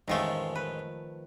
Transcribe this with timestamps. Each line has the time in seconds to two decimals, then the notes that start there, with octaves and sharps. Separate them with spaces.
0.08 A1 F2 D#3 F3 G#3 A3
0.55 B4